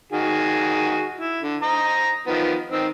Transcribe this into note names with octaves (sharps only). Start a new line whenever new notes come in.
D#3 F#4 G#4
E4
D3
C5 A#5 D#6
D#3 F3 B3
D#3 C4